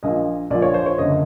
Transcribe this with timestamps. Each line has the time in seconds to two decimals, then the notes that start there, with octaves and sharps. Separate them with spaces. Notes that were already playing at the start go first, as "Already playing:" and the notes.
0.03 A#1 A#2 F3 D#5
0.50 A#1 A#2 F3 D5
0.62 C#5
0.74 C5
0.86 C#5
0.98 F#1 D3 D#5